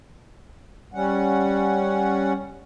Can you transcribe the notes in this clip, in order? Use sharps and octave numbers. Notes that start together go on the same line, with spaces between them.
G3 C#4 F#5